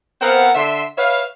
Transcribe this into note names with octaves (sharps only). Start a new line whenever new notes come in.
B3 C4 A#4 C5 F5 F#5
D3 E5 C6
B4 C#5 E5 F5